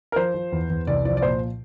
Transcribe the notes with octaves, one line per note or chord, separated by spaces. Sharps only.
A#4
F3 C5
F3
E2
E2
C2 D5
F3 D5
D5
A#2 C5